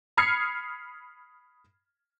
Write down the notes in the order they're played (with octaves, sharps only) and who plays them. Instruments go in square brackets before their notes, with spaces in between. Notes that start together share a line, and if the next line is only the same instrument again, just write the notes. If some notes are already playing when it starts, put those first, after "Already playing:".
[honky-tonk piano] B5 D#6 F6 G#6 C7 C#7